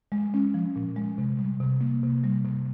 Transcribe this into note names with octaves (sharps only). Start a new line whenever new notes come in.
G#3
C#4
F3
A#2
G#3
C3
G3
C3
A#3
C3
G3
C3